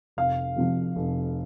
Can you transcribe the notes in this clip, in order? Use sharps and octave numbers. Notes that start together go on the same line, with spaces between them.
F1 F5
F2 C3 F3
F1